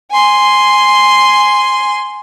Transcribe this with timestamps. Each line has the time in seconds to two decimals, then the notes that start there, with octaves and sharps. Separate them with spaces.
0.11 G#5 C6